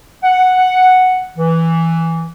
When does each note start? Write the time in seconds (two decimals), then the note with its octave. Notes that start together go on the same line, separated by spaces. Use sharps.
0.23 F#5
1.37 E3